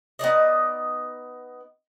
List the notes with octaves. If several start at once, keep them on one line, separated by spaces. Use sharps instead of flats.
B3 D#4 D5 D#5